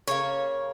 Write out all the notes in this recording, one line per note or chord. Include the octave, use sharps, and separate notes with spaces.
C#3 A#3 C#5